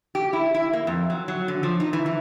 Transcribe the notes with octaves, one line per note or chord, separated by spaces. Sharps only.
G4
E4
E4
A#3
F2
F#3
F#3
D3
F3
D#4
E3
E3